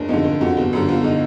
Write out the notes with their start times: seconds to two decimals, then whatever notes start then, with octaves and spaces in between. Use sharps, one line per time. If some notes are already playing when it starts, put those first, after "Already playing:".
Already playing: F#1 D4
0.09 F2 D3 D#4
0.24 F#1
0.41 F2 D3 F#4
0.57 G1
0.73 F#2 D3
0.88 G1 F4
1.04 D3 D#4